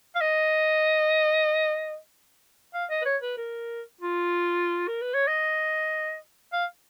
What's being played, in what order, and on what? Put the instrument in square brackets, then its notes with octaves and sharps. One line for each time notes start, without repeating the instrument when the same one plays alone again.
[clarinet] F5
D#5
F5
D#5
B4
C#5
B4
A#4
F4
A#4
B4
C#5
D#5
F5